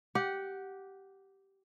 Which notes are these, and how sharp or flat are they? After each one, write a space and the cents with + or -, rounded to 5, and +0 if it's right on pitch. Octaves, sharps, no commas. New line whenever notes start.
G4 -10 F#5 +0